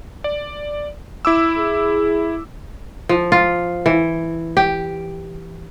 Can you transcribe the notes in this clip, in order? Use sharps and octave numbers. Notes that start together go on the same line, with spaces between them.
D5
E4 D6 E6
G#4
F3
F4
E3
G4